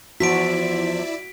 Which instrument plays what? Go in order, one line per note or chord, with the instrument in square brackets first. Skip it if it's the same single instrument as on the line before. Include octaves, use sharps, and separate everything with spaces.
[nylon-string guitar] E2 F3 [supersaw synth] E4 D5 E5 [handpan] F#4 [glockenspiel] B6 D7